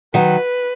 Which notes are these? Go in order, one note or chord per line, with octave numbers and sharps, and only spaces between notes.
D#3 F#3 B4